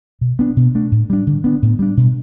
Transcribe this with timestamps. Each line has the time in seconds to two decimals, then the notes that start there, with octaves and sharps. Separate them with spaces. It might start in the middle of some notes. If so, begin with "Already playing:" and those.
0.21 B2
0.39 B3 D4
0.57 B2
0.75 A3 D4
0.92 A2
1.10 G3 D4
1.27 D3
1.44 B3 D4
1.62 A2
1.79 G3 D4
1.97 B2